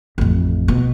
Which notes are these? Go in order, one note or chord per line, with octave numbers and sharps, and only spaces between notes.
A1 F2
B2